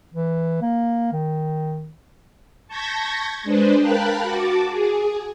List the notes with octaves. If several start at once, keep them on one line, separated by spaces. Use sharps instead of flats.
E3
A#3
D#3
A5 C#6 G6 G#6 A#6 B6
G#3 D4 B4 C5
A#4 F5 G5 A5 B5 F#6
F#4 A5 D6
G#4